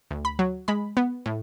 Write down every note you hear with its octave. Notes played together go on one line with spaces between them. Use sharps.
D2
B5
F#3
G#3 B5
B3
A2